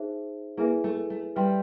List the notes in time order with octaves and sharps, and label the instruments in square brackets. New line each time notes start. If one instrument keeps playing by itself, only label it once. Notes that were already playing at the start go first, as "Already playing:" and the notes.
Already playing: [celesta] D#4 G#4 C5 E5
[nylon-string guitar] A#3 [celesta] E4 G#4 B4 E5 G#5
[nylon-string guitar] A3
A3
[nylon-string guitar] G3 [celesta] B4 E5 G5 C6